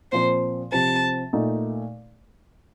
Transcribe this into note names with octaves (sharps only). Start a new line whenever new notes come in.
A#2 F3 C4 C5
C3 F3 C4 A5
A#2 A3 D#4